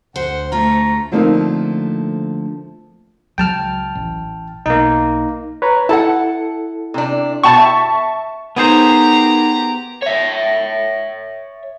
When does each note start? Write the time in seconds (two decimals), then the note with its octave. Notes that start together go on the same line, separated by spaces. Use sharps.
0.16 D2 C5 F#5
0.52 A3 F4 C#5 A#5
1.12 D3 F3 A3 A#3 C4 D#4
3.38 C#2 F#3 G5 A5 F6
3.95 A1
4.66 B1 A#3 D#4
5.62 B4 C#5 A#5
5.89 E4 A4 F#5 A5
6.94 C3 D4
7.43 B2 F#5 G5 A5 C#6
7.58 E5
8.56 B3 D#4 G4 G#4 A#4 C5 A#5
10.02 C#5 E5